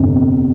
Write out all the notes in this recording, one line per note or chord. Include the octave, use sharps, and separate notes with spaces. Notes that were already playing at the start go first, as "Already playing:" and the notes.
Already playing: G1 F2 C3